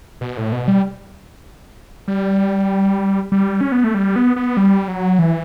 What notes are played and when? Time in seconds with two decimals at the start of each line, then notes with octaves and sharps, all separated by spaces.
0.21 B2
0.37 A2
0.52 B2
0.68 G3
2.08 G3
3.32 G3
3.61 C#4
3.72 B3
3.84 A3
3.94 G3
4.16 B3
4.36 B3
4.57 G3
4.88 F#3
5.19 E3